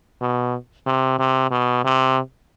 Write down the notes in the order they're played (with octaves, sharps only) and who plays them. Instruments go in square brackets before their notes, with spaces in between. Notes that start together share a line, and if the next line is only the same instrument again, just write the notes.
[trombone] B2
C3
C3
B2
C3